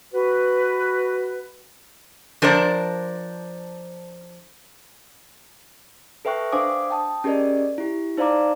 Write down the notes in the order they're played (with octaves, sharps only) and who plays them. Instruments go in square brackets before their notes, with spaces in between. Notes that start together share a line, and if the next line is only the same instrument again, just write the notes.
[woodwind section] F#4 B4
[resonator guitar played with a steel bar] F3 D4 A#4 C5 D5
[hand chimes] A4 B4 E5 G5 C#6 F#6
D4 C5 F5 G#5 D6 D#6
G5 A5 D#6
C#4 G4 G#4 A#4 D5 D#5
E4 G4
D#4 C5 D5 F5 A#5 D6